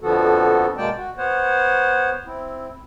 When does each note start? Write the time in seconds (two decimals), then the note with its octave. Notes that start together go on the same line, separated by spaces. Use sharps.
0.01 F2 D3 F3 B3 F#4 A4
0.77 B2 G#3 A#3 D5 G5 A5
0.97 F#4
1.17 B3 C5 C#5 F#5
2.26 C4 E4